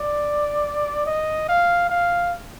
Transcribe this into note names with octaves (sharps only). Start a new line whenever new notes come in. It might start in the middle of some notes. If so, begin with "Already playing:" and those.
Already playing: D5
D#5
F5
F5